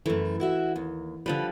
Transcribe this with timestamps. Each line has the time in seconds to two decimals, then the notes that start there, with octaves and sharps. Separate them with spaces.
0.06 F#2 E3 A3
0.40 E4 F#4 E5
0.76 D#2
1.26 D3 F3 G3 B4